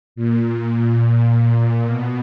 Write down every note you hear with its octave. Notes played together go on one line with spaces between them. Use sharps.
A#2
B2